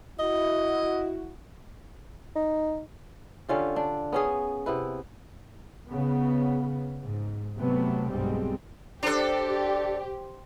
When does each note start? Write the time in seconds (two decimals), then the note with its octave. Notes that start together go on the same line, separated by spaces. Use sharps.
0.19 E4 F#4 D#5
2.36 D#4
3.48 D3 C#4 F4 G4
3.76 D4
4.12 B3 C#4 G#4
4.66 C3 B3 E4 B4
5.89 C#3 B3
7.01 G#2
7.56 C3 F#3 A3 B3
8.09 B1 G2 G3 G#3 C4
9.03 D4 G4 A4 C5 G5